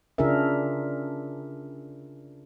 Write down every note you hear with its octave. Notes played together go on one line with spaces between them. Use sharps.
C#3 D4 F4 G#4 A#4 E5